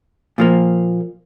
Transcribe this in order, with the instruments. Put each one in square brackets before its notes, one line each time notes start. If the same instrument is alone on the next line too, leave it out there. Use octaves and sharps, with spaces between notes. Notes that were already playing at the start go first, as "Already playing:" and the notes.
[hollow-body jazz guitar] A#2 F3 A#3